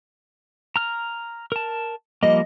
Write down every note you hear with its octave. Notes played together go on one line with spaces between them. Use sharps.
A#5 F6
A#4 A5
F3 G3 A#3 D#5